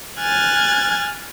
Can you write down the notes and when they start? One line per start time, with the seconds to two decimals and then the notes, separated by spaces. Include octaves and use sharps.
0.20 G#5 F6 F#6 G#6 A6